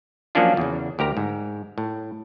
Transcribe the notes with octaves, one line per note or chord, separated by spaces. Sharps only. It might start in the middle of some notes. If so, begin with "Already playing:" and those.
F3 F#3 A#3 C#4 D4 F4
E2 C#3
D2 G4 A#4 A#5
G#2
A2